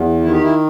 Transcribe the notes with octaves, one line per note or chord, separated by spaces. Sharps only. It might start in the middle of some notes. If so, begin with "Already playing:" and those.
Already playing: E2
D#3 E4
G4
E4